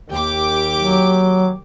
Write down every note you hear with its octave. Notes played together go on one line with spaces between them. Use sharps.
D#2 G4 D6
F#3